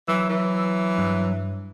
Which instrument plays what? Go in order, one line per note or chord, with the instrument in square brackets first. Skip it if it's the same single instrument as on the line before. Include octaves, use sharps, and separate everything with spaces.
[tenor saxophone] E3 [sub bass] F#3 [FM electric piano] E6
[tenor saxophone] E3
[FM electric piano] G2